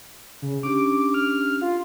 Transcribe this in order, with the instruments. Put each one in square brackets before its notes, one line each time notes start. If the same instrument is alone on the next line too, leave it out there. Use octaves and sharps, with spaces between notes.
[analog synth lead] C#3
[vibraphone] C#4 D4 G4 [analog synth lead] D6
[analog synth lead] F6
F4